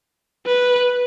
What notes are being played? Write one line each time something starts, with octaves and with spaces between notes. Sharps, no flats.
B4